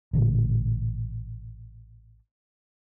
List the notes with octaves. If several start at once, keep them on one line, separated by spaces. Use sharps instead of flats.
A1 A#2 D3 A3